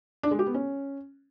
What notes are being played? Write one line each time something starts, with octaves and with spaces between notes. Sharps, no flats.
D4
G#3
G4
B3
C#4